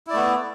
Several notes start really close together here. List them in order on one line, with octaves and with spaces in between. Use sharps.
E4 D5 A3 B3